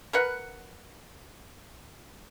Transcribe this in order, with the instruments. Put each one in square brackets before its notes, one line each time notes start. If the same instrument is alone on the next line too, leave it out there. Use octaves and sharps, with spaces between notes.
[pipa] A#4 B4 F#5